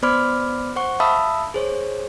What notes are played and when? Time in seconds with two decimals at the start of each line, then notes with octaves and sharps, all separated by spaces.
0.02 B3 C5 D5 B5 D6 F6
0.76 C5 F#5 C#6
1.00 E5 F5 A5 B5 D#6 E6
1.54 G#4 C5 C#5